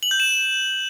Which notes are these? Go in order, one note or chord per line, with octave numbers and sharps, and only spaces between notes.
F#7
G6
E7